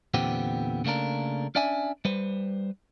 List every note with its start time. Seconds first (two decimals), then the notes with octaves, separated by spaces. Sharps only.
0.14 E2 A#2 D3 B3 C4 G4
0.85 C#3 A3 A#3 D4 A#4
1.55 C#4 D4 D5 E5 G#5
2.05 G3 B4 C5